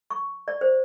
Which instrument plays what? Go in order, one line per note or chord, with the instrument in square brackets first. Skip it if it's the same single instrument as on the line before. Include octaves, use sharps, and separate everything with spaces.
[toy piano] C#6
D5
C5